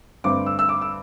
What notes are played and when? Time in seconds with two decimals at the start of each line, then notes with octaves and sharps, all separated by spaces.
0.24 G2 D3 A3 C4 D6
0.46 E6
0.59 E6
0.69 D6
0.81 E6